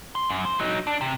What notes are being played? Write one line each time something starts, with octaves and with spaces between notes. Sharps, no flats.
C6
F#2
C5
F#3 D#4
D4
C3